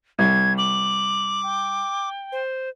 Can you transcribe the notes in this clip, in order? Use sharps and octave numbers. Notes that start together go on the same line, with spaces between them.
C2 G#6
D6 F#7
G5
C5